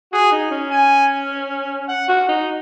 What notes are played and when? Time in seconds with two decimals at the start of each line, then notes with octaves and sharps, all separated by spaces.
0.12 F#4 G#4
0.32 D#4
0.51 C#4
0.71 G#5
1.88 F#5
2.08 F#4
2.29 D#4